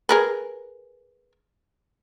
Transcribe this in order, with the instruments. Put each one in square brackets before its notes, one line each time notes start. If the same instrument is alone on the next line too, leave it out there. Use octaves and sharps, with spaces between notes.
[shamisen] G#4 A#4 B4